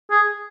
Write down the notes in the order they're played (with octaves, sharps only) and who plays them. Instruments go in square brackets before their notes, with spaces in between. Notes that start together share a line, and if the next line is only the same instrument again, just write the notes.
[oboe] G#4